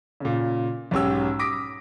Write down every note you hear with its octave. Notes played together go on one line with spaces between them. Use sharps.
A#2 C#3
B1 G#2 C#4 G4 E6
D6 D#6 A#6 B6 D7